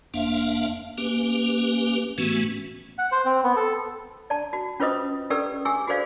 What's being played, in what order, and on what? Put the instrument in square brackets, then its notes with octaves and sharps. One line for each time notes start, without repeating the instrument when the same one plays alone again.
[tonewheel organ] F#1 F2 A#3 D4 E5 F5
A#3 C#4 G4 B4
A2 E3 A3 B3 C#4 F#4
[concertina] F#5
C5
C4
B3
A4
[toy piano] D5 A5
F#4
C#4 F4 B4 C5 D#5 D#6
C#4 G4 A4 B4 D5 E6
G4 G#4 G#5 E6
F#4 G#4 A4 C5 D5 F5